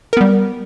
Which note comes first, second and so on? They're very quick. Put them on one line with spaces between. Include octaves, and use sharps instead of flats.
A#4 B3 G3